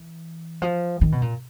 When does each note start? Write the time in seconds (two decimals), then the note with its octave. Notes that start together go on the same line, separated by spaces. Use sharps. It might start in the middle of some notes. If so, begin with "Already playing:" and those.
Already playing: E3
0.62 F3
1.01 D#3
1.12 B2
1.22 A#2